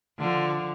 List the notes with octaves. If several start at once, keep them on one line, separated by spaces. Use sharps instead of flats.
D3 F3